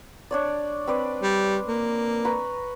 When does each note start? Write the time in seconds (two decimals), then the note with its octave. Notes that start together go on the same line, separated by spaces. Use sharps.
0.31 D4 C#5 D5
0.87 C4 B4 D5
1.22 G3
1.68 A#3
2.25 B4 A#5 C#6